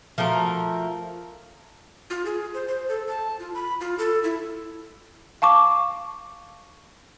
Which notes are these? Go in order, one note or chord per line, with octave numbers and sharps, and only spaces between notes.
F3 A3 F#4 A#4
F4
G#4
C5
C5
A4
A5
F4
B5
F4
A4
E4
F5 A5 C#6 D6